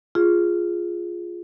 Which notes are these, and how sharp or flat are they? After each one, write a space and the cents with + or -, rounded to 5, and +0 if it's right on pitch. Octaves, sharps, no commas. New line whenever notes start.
F4 +0 G#4 +0